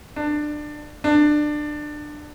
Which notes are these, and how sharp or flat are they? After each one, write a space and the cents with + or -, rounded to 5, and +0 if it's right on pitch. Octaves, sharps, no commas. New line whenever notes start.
D4 +20
D4 +20